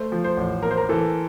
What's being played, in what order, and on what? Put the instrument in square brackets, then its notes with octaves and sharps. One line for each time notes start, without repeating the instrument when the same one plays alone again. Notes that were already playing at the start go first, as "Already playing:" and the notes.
Already playing: [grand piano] A3 [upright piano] C5
[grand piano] F3
[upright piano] C5
[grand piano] A1
[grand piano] A#3 [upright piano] A#4
[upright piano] C5
A#4
[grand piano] E3 [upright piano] A4